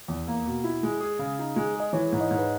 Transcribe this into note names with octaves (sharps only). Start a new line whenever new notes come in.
E2
A#3
B2
E4
G#3
G#4
C#3
D#4
G#3
G#4 D#5
E3 C#5
G#2
D#5
G#2
B4